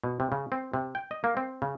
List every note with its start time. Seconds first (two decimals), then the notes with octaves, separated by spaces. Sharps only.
0.04 B2
0.20 C3
0.32 C#3
0.52 C4
0.74 C3
0.95 G5
1.11 D#5
1.24 A#3
1.37 C4
1.62 C#3